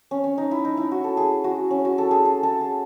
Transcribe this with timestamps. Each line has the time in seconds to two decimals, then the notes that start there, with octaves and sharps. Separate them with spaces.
0.11 C#4
0.24 C#4
0.38 D#4
0.51 E4
0.65 D#4
0.77 E4
0.91 F#4
1.04 A4
1.17 G#4
1.44 F#4
1.71 C#4
1.85 F#4
1.98 A4
2.11 G#4
2.25 A4
2.43 A4
2.61 G#4